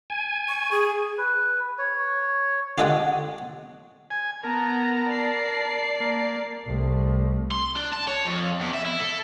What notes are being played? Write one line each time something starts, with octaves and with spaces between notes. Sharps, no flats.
G#5
C#6
G#4
B4
C#5
F4 G4 A4 D#5 F#5 G5
G#5
B3 A#4 A5 A#5
D5 C7
A#3
C2 A3
C6
D4
A5
C#5
F2
E2
E5
E4
A4